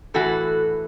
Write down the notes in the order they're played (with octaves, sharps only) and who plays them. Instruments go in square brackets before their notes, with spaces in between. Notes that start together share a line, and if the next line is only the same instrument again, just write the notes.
[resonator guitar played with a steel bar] A2 E3 F#4 A4